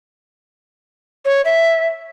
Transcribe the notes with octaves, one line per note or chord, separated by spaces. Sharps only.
C#5
E5